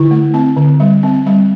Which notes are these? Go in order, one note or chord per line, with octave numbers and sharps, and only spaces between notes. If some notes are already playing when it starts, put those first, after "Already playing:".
Already playing: D3 E4
A3
C4
D3
G3
C4
G3